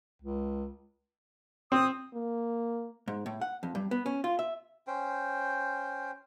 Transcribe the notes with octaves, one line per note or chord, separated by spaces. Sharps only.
C#2
C4 D#6
A#3
G#2
A2
F#5
F2
G2
B3
C#4
F4
E5
C#4 C5 G5